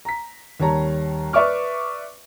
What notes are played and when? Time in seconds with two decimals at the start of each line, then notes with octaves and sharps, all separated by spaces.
0.05 A#5 B6
0.60 D#2 G3 C#5 A5 A#5
1.33 B4 D5 E5 C#6 D6 F6